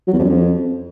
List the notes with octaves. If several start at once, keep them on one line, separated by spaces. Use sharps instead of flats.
F#3
E2
F2
F#2
F2